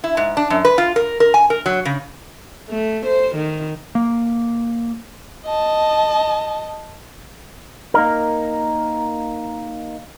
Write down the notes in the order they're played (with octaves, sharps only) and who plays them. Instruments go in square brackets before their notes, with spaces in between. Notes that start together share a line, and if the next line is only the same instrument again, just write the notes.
[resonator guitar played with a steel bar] E4
G#2
D4
F#2
B4
F4
A#4
A#4
G#5
A#4
F#3
C#3
[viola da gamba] A3
C5
D#3
[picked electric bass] A#3
[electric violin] D#5 A5
[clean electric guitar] A#3 D#4 A#4